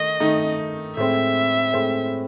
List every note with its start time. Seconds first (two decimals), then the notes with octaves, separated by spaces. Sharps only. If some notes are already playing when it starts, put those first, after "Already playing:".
Already playing: D#3 A3 D#5
0.20 D#3 A3 D#4
0.97 A2 G#3 C4 E5
1.74 A2 G#3 C4